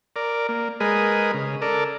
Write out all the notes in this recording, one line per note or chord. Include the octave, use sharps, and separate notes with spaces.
A#4 D5
A#3
G#3 G#4 A#4 B4 D#5
C#3
A4 A#4 D5